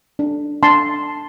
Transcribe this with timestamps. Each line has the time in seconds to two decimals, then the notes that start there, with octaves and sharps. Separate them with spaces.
0.19 D4
0.63 D4 A5 C6